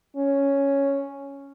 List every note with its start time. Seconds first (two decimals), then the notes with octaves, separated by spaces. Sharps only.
0.16 C#4